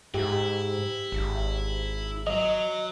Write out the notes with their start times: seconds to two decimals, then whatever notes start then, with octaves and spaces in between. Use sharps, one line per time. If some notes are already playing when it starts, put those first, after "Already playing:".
0.14 G#2 E4 G4
1.12 G#1
2.27 F#3 D#5